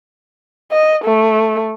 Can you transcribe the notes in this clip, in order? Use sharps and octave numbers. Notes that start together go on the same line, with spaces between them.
D#5
A3